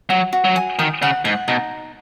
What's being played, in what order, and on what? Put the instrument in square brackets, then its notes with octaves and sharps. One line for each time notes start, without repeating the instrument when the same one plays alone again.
[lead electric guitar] F#3 [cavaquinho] F#4
[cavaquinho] F#4
[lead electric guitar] F#3
[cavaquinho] G#5
[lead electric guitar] D#3 [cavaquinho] D#6
[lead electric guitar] C#3 [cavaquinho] F#5
[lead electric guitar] G#2 [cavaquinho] F#5
[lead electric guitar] B2 [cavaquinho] D#4